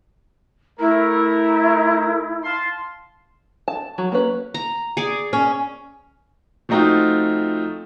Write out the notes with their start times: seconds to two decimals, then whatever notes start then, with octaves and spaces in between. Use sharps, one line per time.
0.80 A3 E4 A#4
2.44 F5 A5 C6
3.68 A5
3.98 F#3
4.12 A#3 C#4 B4
4.54 A#5
4.97 G#4 D5
5.33 C#4
6.69 F3 A3 C4 D#4 F4 F#4